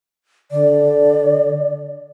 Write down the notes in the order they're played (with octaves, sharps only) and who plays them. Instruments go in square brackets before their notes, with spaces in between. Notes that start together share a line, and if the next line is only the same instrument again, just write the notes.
[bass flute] D3 [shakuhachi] D5